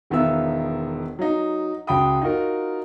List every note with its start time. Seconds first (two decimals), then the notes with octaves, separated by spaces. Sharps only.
0.10 E1 D#3 B3 F4 E5 E6
1.19 F#3 D#4
1.87 C#2 F#4 G5 B5 D#6
2.22 D#4 F4 F#4 A#4